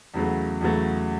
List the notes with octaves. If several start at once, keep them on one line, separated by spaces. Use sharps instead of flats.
E2 C#3 F#3 A3
E2 C#3 F#3 A3